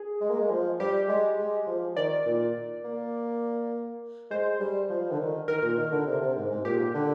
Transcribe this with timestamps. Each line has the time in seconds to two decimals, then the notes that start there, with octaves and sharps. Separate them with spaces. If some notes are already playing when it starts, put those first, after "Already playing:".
Already playing: G#4
0.21 G#3
0.29 A#3
0.38 G#3
0.50 F3
0.80 G3 G4
1.08 G#3
1.39 G#3
1.67 F3
1.96 D#3 D5
2.26 A#2
2.84 A#3
4.30 G#3 C5
4.59 G3
4.90 F3
5.11 D3
5.19 D#3
5.48 D#3 A#4
5.62 A#2
5.77 D#3
5.92 D3
6.06 C3
6.21 C3
6.35 G#2
6.51 G#2
6.65 A#2 G4
6.94 D3